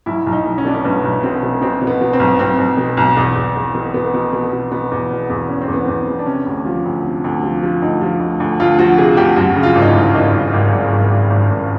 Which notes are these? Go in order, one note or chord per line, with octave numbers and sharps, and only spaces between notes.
B1 E4
B1
D#4
B1
C#4
B2 D4
C#4
B1 B3
B1
B2 C4
B2
B2 C4
B2
B3
B2
C4
B1
B1 C4
B1
B2
B1
E2
E2
E2
B2
B2 B3
B2
B2
B2
B2 B3
E2
B2
E2
E2 C#4
C4
E2
B3
E2 C4
E2
D4
C3 C#4
D2
F3
D2
C3
D2
F3
F3
D2 D#4
F3
D2
D2
D2 F4
F3 F#4
C3 G#4
D2 G4
F#2 F#4
C#3
F4
G#1
D#4
E4
G#1
G#1 D#4
G#1
G#1
G#1
G#1
G#1
G#1
G#1